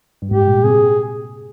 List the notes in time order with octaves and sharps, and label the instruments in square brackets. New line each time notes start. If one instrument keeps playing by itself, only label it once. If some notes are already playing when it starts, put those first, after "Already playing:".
[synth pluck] G2
[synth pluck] G#2 [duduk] G4
[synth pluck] A#2
[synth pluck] C3 [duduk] G#4